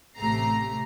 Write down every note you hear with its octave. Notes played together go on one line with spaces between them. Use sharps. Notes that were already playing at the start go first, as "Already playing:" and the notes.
A1 C3 A3 G4 A#5 C7